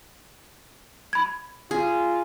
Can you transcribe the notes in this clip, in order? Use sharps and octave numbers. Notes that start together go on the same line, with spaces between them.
B5 G#6
F4 G#4